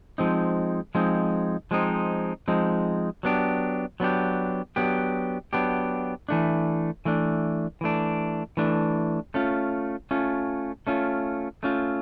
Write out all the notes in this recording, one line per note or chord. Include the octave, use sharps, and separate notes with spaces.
F3 G#3 C4 D#4
F3 G#3 C4 D#4
F3 G#3 C4 D#4
F3 G#3 C4 D#4
F#3 B3 D4 G4
F#3 B3 D4 G4
F#3 B3 D4 G4
F#3 B3 D4 G4
E3 A3 D4
E3 A3 D4
E3 A3 D4
E3 A3 D4
A3 C#4 F4
A3 C#4 F4
A3 C#4 F4
A3 C#4 F4